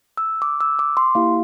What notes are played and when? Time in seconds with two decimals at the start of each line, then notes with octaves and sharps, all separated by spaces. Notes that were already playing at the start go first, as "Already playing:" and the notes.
0.17 E6
0.42 D6
0.61 E6
0.79 D6
0.97 C6
1.15 A#3 E4 G4 F5